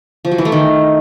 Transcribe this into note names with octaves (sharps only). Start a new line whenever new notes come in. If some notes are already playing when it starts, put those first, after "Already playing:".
F3
F#3
E3
A3
D#3